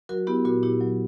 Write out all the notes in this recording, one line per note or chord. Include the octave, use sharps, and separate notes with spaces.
F#3 F#4 A#4
B3 E4 G4
A#2 F#4 A#4
A#2 E4 G4
F#3